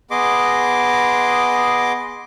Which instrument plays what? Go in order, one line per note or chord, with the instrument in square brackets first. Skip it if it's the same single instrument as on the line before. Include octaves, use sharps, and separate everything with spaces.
[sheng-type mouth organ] B3 G#4 D#5 C6 D6